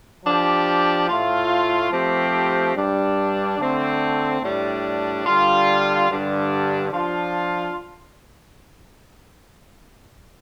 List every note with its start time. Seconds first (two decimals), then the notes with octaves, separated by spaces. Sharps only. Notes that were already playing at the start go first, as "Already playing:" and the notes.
0.25 F3 D4 G4
1.09 A2 A3 F4
1.91 F3 A3 C4 G4
2.75 G2 G3 D4
3.58 D3 A3 C4
4.41 A2 G3 D4
5.26 D3 G3 F4
6.09 G2 D3 G3 D4
6.92 F3 D4 F4